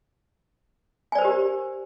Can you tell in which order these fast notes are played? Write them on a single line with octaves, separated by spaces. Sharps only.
G#5 D5 C5 A#4 G4